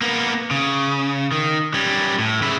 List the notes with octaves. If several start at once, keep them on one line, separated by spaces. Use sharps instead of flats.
A#3 B3
C#3
D#3
G3 C#4
A2
C#3 E4